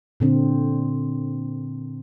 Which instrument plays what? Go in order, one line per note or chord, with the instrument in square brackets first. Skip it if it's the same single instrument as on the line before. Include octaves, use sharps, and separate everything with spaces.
[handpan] A#2 D3 C4